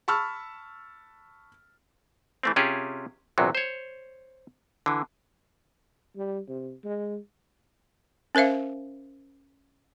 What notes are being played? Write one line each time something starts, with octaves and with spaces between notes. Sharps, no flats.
A5 B5 C#6 E6 F6
E3 A3 C4
C3 C#4 F4 G4 G#4
A#1 E2 C3 F#3
C5 C#5
D3 E3
G3
C3
G#3
C#4 A#4 C5 E5 F5